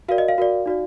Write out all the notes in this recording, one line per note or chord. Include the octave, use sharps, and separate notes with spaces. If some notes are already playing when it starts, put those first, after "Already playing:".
F#4 A#4 D5 F5
D#5
F5
F#4 A#4 D5
D#4 F#4 D5